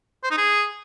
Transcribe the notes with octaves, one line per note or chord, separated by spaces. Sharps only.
C5
D#4
G#4